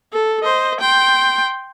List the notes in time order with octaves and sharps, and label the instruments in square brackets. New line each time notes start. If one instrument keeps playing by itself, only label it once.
[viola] A4
C5 D#5
G5 C6